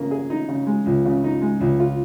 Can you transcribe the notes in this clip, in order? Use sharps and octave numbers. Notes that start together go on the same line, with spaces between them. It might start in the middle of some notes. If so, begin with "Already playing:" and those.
Already playing: C#3 A#3
G#4
D#4
C#3
G#3
C#2
C#3
D#4
G#3
C#2
F4